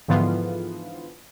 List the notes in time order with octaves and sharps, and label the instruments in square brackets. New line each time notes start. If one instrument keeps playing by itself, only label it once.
[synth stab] G#2 D3 E3 F3 B3 F4